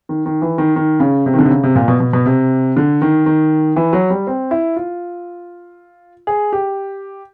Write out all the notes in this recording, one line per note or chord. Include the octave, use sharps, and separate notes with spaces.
D#3
D#3
E3
D#3
D#3
C#3
C3
D#3
D3
C3
C#3
C3
A#2
B2
B2
B2
C3
D3
D#3
D#3
E3
F#3
G3
C4
E4
F4
G#4
G4